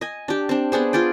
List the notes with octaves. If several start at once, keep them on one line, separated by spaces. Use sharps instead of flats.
D#5 G#5
D4 G4
C4 D4
B3 D4 G#4 C5
F4 G#4 D5 G5